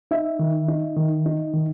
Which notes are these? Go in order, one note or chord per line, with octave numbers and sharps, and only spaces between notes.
D#4 E5
D#3
D#4
D#3
D#4
D#3